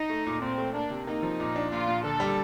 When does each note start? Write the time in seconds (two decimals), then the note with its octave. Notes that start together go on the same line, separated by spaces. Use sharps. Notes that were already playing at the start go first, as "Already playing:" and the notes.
Already playing: D#4
0.10 A3
0.26 A#2
0.42 A#2 C4
0.58 A3
0.74 A#3 D4
0.90 C3
1.06 A#3 D#4
1.22 F3
1.40 A#2
1.56 D4
1.72 A#2 F4
1.88 A#2
2.04 D3 A4
2.20 G3